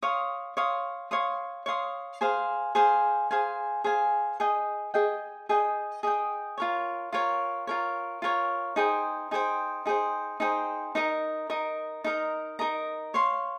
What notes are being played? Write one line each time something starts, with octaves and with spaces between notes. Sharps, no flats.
C#5 F5 C6 D#6
C#5 F5 C6 D#6
C#5 F5 C6 D#6
C#5 F5 C6 D#6
G#4 C5 F5 G#5
G#4 C5 F5 G#5
G#4 C5 F5 G#5
G#4 C5 F5 G#5
G#4 D#5 G5
G#4 D#5 G5
G#4 D#5 G5
G#4 D#5 G5
F4 A#4 C#5
F4 A#4 C#5
F4 A#4 C#5
F4 A#4 C#5
D#4 G#4 C5 G5
D#4 G#4 C5 G5
D#4 G#4 C5 G5
D#4 G#4 C5 G5
D#4 A#4 D#5 A#5
D#4 A#4 D#5 A#5
D#4 A#4 D#5 A#5
D#4 A#4 D#5 A#5
C#5 F5 C6